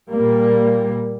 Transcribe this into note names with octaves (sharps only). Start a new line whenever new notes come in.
A#2 G3 A#3